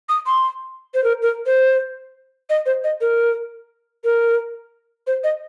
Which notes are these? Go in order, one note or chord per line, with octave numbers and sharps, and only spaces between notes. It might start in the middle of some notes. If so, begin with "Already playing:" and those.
D#6
C6
C5
A#4
A#4
C5
D#5
C5
D#5
A#4
A#4
C5
D#5